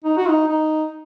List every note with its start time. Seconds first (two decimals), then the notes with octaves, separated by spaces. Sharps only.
0.04 D#4
0.17 F#4
0.28 D#4
0.48 D#4